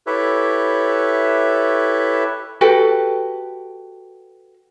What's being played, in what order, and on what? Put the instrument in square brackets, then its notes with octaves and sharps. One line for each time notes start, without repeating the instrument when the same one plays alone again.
[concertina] E4 G4 A4 B4 C#5 E5
[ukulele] F#4 G4 A4 B4